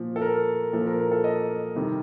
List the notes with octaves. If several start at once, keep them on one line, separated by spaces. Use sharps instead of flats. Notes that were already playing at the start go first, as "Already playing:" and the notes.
Already playing: A#2 F3
A4
A#4
A#2 F3 A4
A#4
A#4
A4
D#5
C3 D#3 G3